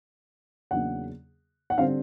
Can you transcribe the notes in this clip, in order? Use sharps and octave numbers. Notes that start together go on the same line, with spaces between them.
E2 C#3 F#3 A#3 D4 F#5
F#5
D3 G3 C4 F5